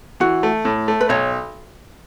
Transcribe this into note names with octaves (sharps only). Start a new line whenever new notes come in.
E3 F#4
A3
A2
A3
B4
B1 C#5